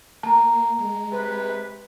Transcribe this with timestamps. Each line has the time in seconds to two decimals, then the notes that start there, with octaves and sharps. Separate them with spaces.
0.23 A#3 A5 A#5
0.78 G#3
1.12 C3 B4